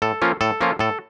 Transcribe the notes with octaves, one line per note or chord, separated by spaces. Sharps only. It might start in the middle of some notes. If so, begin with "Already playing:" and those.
A2 A4
F3 A#3 C#4 F4
A2 A4
F3 A#3 C#4 F4
A2 A4